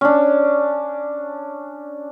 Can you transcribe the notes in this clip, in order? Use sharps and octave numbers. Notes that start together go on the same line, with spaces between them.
C#4 D4